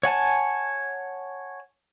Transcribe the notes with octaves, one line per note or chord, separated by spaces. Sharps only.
C#5 F#5 G#5 A5